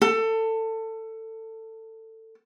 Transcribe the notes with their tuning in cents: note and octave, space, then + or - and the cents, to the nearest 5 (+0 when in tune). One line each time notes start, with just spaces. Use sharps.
A4 +20